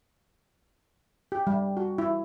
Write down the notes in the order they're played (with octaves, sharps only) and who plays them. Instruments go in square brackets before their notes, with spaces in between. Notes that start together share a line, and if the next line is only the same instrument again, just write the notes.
[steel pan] G4
G3
F#4
E4